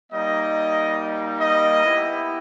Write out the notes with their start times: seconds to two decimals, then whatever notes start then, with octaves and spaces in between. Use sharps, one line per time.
0.12 G3 A#3 D#4 D#5
1.41 D#5
1.84 B3 E4 G4